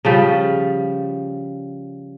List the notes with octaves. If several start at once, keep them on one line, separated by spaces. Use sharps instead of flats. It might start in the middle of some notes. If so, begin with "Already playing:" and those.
C#3 F3 G3